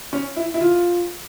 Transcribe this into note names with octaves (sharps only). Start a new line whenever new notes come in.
C#4
E4
E4
F4